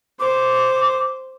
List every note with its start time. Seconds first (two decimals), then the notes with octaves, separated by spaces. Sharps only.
0.20 C5 D6